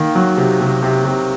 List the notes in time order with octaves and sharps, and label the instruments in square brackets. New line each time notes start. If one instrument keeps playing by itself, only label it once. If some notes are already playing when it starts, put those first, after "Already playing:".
Already playing: [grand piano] D#3 A#3
F#3
C3
C3
C3
C3